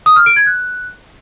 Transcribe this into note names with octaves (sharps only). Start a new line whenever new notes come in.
D#6
F6
D7
G#6
F#6